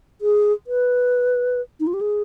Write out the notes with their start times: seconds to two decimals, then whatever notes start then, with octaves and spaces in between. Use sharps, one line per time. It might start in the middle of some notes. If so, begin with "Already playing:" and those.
0.21 G#4
0.67 B4
1.80 D#4
1.87 F4
1.93 G4
2.01 G#4